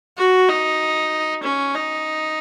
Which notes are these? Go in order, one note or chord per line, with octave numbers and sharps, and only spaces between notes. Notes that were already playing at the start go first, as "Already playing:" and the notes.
F#4
D#4
C#4
D#4